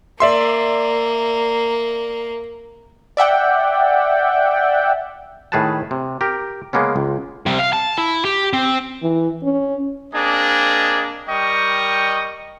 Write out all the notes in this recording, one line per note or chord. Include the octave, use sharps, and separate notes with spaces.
A#3 D5 E5 C6
D5 E5 F#5 G5
A2 D#3 G#4 B4 F#5 A5
C3
G4 A#4
C#3 G#3 A#3 B3 C#4
C#2
C3 G3
F5
A5
E4
G4
C4
E3
C#4
A#3 C4 D4 G#4 D#5
G3 A#4 D#5 G5 C#6